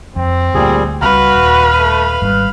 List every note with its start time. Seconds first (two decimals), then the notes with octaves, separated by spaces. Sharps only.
0.16 F2 C4
0.54 D2 A#2 G3 G#4
1.02 C#2 G3 C4 F#4 B4 F5 B5 F6
1.35 D#1
1.78 A3
2.22 G#1 G#2 G3 B4